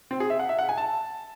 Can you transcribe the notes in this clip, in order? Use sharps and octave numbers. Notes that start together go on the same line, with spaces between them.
C4
G#4
E5
F#5
E5
F#5
G#5
A5